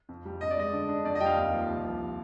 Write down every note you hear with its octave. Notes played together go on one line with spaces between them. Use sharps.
F2
G3
G2 D#5
D5
G#3 D#5
D3
D4
F2 D5
D#5
G3 G5
F5
D#2
F3
C2
F3